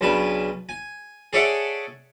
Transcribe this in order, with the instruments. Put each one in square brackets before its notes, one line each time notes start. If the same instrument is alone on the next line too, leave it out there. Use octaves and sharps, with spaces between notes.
[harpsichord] B1 C#3 D4 B4
G#5
G#4 A4 C#5 D5 E5 F#5